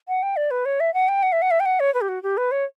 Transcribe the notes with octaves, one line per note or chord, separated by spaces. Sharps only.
F#5
G5
D5
B4
C#5
E5
F#5
G5
F#5
E5
F#5
E5
G5
F#5
C#5
B4
G4
F#4
G4
B4
C#5